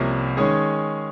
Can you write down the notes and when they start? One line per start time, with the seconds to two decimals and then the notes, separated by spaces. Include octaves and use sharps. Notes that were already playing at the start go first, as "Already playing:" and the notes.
Already playing: C2 C3 F3 A#3 C#4
0.37 D#3 G#3 C#4 G#4